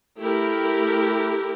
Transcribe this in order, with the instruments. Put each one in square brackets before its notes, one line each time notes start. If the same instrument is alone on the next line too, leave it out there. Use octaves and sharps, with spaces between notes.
[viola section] A3 E4 G4 A#4